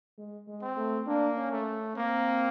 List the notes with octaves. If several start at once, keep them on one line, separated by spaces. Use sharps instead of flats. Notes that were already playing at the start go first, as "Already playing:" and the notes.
G#3
G#3
C4
A3
A#3 D4
C#4
A3
A#3 C4